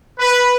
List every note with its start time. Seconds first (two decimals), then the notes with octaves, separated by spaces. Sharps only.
0.18 B4